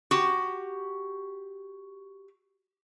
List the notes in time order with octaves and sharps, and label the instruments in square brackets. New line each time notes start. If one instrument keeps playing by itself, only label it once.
[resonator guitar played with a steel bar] F#4 G4